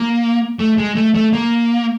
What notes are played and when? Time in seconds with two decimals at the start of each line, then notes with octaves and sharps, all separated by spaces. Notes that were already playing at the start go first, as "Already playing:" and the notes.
Already playing: A#3
0.59 A3
0.78 G#3
0.95 A3
1.15 A3
1.32 A#3